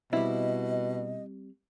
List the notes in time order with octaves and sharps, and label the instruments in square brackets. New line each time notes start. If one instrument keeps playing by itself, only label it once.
[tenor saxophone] B2 [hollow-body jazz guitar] G3 C4 [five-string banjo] E4 [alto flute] D#5